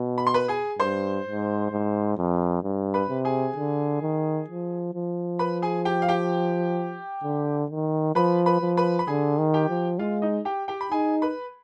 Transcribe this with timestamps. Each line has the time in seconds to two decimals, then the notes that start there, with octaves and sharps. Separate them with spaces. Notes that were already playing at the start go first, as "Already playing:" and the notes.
Already playing: B2
0.18 B5
0.27 C6
0.34 B4 B5
0.48 G#4 G#5
0.79 G2 C5 C6
1.26 G#2
1.72 G#2
2.18 F2
2.63 G2
2.94 B4 B5
3.09 C3
3.25 G#4 G#5
3.56 D3
4.02 D#3
4.48 F3
4.94 F3
5.39 B4 B5
5.62 G#4 G#5
5.85 G4 G5
6.02 F5
6.08 G4 G5
7.24 D3
7.70 D#3
8.15 F3 B4 B5
8.46 B4 B5
8.61 F3
8.77 B4 B5
8.99 B5
9.07 D3 G#4 G#5
9.38 D#3
9.54 G4 G5
9.69 F3
9.99 G#3 F4 F5
10.22 D#4 D#5
10.45 G4 G5
10.68 G4 G5
10.81 B5
10.92 D#4 G#4 G#5
11.22 B4 B5